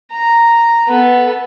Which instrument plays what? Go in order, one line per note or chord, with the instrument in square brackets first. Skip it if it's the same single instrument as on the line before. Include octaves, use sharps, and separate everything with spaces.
[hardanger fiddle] A#5
B3 A4